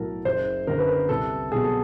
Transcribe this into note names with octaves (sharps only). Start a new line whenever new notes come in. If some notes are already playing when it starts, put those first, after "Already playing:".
Already playing: B1 A2 F#3 A4 A#4
F#1 C5
F#2 D3 A#4
B4
A#4
C2 A4
B2 F#3 G#4
A4